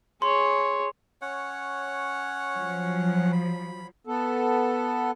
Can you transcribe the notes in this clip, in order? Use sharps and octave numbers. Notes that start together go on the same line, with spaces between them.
G#4 C#5 C6
C#4 C#5 F#5
F3 F#3
B5
B3 A4